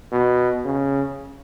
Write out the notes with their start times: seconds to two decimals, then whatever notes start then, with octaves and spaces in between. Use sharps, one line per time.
0.12 B2
0.65 C#3